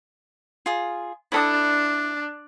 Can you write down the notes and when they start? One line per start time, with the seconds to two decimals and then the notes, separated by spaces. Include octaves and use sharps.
0.66 F4 G#4
1.32 D4 E4 A4 D#6